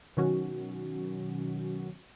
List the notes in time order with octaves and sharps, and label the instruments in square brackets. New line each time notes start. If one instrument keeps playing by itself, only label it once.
[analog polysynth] B2 D#3 F#3 C#4 F#4